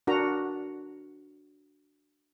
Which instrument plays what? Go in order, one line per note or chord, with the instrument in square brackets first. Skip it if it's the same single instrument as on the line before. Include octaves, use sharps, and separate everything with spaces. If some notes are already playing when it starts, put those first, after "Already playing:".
[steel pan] D4 F#4 A#4 A#5